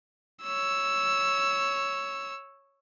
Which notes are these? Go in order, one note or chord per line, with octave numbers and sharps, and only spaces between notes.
C#5 E6